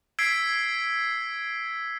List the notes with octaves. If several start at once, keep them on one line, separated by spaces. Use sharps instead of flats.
E6 G#6 B6 C7 D7